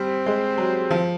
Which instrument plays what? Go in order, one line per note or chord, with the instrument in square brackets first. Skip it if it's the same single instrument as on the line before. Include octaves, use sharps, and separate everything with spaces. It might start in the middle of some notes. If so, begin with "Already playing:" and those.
Already playing: [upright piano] G3 [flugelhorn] C4
[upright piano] G#3
F#3
F3